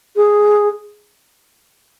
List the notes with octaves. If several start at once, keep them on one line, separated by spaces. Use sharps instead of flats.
G#4